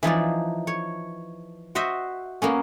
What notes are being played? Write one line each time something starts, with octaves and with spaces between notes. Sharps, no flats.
E3 F3 D#4 D5
C#5
F#4 C5 D#5 E5
A#3 B3 C#4